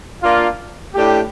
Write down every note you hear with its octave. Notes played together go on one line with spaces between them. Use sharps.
A#3 D4 F4
A2 A3 D4 G4